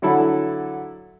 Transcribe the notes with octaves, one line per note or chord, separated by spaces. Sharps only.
D3 F#3 E4 A4 B5